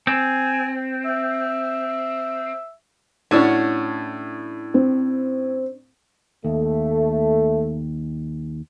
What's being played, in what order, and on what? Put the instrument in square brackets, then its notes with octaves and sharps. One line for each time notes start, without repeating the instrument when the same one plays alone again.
[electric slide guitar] C4 [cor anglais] G#5
[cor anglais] E5
[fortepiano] A2 [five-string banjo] C#4 D4 F#4
[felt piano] C4
[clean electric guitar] D#2 [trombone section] A3